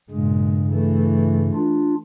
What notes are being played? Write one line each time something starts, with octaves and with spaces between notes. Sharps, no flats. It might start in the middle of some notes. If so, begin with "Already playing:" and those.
G2 A#2 C#3 G#3
E3 A3
D4 F4